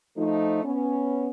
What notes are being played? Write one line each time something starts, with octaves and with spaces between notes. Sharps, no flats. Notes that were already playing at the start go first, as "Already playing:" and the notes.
F3 A3 D#4
B3 C#4